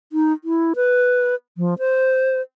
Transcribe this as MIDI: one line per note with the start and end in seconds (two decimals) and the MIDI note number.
0.13 0.33 63
0.44 0.73 64
0.76 1.35 71
1.57 1.74 53
1.79 2.41 72